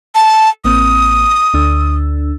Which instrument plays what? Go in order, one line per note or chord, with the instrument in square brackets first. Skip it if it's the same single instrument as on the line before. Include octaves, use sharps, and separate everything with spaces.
[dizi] A5
[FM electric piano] A1 A#3 C4 [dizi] D#6
[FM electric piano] D2 D4 E6